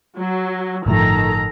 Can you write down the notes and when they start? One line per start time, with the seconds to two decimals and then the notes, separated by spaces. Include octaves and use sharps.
0.17 F#3
0.86 G1 A2 D#3 F3 A4 A#5